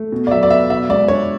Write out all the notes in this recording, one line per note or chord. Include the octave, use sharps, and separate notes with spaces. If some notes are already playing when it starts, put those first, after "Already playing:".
Already playing: A3
B2
D5
F#3 E5
D5
B3 E5
B2 E5
G#3 D5
D4 C#5